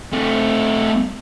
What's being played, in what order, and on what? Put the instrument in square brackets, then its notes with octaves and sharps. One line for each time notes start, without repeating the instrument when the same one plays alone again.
[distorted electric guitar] A3 C4